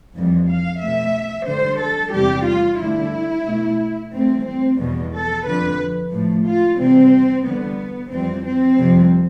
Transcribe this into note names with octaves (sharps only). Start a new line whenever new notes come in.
F2 E3 G3
F5
B2 A3 E5
G2 D3 G3 C5
A4
E2 C3 G3 G4
F4
G2 D3 A3 E4
B2 A3
G2 E3 A3 C4
C4
E2 B2 G3
A4
F2 D3 F3 B4
A2 F3 A3
F4
E2 C3 E3 G3 C4
E2 D3 G3 B3
F2 E3 G3 C4
C4
F2 C3 G3